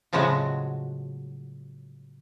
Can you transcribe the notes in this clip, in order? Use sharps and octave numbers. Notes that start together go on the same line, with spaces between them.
A2 C#3 F3 F#3 G#3 F#4